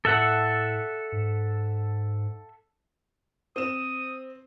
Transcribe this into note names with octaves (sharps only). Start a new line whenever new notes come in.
A2 A4 E5 F#5
G#2
C4 D#6 E7